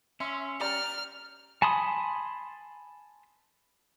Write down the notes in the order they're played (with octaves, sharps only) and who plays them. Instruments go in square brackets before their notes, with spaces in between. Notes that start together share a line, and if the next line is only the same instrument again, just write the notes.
[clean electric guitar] C#4 [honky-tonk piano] E5 C6
[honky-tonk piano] G4 D5 A#5 [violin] F6
[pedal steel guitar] G#5 A5 B5 C6 D#6